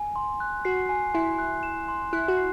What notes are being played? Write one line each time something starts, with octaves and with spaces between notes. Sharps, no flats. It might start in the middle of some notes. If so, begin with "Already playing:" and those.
Already playing: G#5
C6
F#6
F#4 C7
G#5
E4 C6
F#6
E7
C6
E4 F#6
F#4
C7